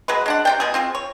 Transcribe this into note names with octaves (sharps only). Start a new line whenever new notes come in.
F#3 G#3 G#4 B4
G#3 D4 F#5
C3 D4 G5
B2 G#4
C4 F4 G#4
C#5